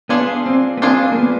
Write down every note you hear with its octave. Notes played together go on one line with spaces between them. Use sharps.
B3 D4 F4 G#4
C4
B3
C4 D4 F4 G#4
A#3
B3